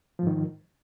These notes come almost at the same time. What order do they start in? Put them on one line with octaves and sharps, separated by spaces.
F3 G#2 D#3